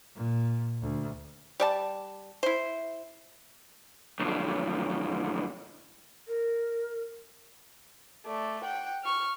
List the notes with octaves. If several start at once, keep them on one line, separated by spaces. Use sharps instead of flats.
A#2
D2
G3 D5 A5
E4 C5
B1 F2
A#4
A3 D5
F#5 G5
C#6 F6